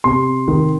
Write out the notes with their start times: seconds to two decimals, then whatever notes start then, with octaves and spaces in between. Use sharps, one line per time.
0.04 C3 C6
0.48 D#3